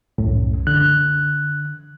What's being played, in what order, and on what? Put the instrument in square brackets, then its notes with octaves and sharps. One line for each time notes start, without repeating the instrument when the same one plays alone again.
[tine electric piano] C2 F#2 [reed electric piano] A2
[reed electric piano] D3 [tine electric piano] F#6